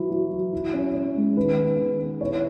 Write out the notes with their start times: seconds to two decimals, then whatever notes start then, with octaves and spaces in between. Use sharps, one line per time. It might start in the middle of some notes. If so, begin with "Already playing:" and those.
Already playing: E3 F#3 E4
0.11 F#3
0.32 F#3
0.53 E4
0.73 C#4
0.95 C#4
1.16 G#3
1.36 D#3 B4
1.58 B3
1.79 D#3
2.00 B3
2.21 E4 C#5